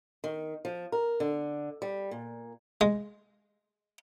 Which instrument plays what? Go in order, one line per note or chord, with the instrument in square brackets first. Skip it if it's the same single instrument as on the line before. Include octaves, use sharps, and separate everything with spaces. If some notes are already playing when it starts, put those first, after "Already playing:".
[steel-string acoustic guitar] D#3
F3
A#4
D3
G3
A#2
[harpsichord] G#3